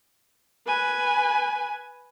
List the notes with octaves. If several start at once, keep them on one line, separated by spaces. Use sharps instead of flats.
B4 G#5